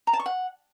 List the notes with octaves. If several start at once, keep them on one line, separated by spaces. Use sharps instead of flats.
A#5
A5
C#6
F#5